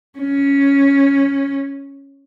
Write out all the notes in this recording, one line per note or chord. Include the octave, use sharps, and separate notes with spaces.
C#4